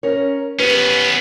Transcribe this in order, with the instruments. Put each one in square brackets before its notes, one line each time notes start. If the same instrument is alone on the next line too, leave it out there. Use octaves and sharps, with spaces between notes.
[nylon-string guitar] C#4 A#4 C#5
[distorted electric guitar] B3 C#4 [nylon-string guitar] G4 B4